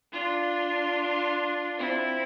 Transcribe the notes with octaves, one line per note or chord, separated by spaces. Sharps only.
D4 F4
C4 E4